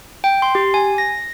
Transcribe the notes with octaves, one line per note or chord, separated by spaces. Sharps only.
G5
C6
G4
G#5
A#6